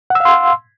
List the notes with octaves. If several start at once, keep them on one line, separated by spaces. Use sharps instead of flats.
F5 F#5 C6 E6